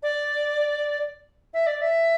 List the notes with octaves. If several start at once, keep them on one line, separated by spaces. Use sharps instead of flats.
D5
E5
D5
E5